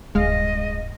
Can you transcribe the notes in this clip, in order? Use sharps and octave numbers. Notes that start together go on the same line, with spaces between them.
D1 G2 G#3 D#5 F5